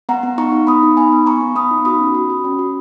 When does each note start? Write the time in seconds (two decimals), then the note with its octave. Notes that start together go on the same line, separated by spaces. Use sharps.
0.09 B3 F#5 A#5
0.23 B3
0.38 D#4 A#5 C#6
0.52 D#4
0.67 B3 B5 D#6
0.83 D#4
0.97 B3 G#5 B5
1.12 B3
1.26 B3 A#5 C#6
1.41 B3
1.56 B3 B5 D#6
1.71 D#4
1.85 F#4 B5 D#6
2.00 C#4
2.15 F#4
2.30 F#4
2.44 C#4
2.59 F#4